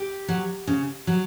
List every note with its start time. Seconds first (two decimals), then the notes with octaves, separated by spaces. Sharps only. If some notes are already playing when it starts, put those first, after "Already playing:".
Already playing: G4
0.28 F#3
0.67 C#3
1.07 F#3